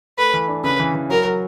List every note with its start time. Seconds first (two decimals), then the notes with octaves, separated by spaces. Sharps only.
0.18 A3 B4
0.34 E3
0.48 D4
0.64 C#3 B4
0.79 E3
0.95 E3
1.10 F#3 A#4
1.25 F#3